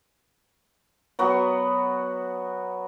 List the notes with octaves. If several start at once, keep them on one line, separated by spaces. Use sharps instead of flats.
F#3 B3 F#4